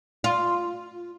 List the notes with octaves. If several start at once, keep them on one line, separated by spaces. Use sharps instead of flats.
F4